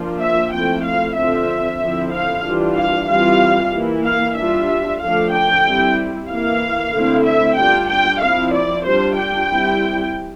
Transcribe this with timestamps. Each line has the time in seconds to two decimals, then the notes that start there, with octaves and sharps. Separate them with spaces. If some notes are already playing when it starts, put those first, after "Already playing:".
Already playing: F3 A#3 D4 F4
0.20 E5
0.52 F3 A3 C4 E4 G5
0.84 F5
1.16 D3 F3 C4 F4 E5
1.80 D3 F3 C4 E4
2.13 F5
2.44 E3 G3 D4 F4
2.76 F5
3.09 E3 G3 C4 F4 F5
3.73 E3 A#3 E4
4.05 F5
4.36 G3 D4 F4 E5
5.00 D3 F3 A3 D4 F5
5.32 G5
5.64 G3 C4 E4
6.28 E3 A#3 E4 F5
6.92 D3 A3 C4 E4
7.25 E5
7.57 G3 D4 F4 G5
7.88 G5
8.20 F3 C4 E4 F5
8.53 D5
8.84 G3 D4 F4 C5
9.17 G5
9.49 G3 C4 E4